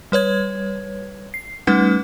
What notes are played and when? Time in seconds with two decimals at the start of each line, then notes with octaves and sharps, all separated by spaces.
0.12 G3 B4 C#5 G#6
1.34 C7
1.67 G3 A3 C#4 D#4 B4 F#5